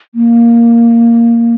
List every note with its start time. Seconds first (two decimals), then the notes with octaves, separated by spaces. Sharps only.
0.15 A#3